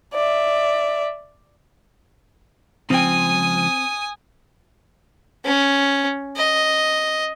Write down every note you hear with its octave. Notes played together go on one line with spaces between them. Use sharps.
D5 E5
C#2 F3 C4 G5 G#5 D#6
C#4
D#5